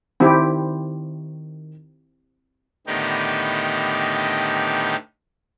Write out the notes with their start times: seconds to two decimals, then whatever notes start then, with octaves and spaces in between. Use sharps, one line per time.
0.20 D#3 C4 E4 G4
2.87 A2 D3 D#3 B3 D#4 G4